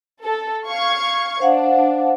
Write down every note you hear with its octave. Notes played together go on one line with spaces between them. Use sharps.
A4
F5 C#6 G#6
D4 C5 F5 F#5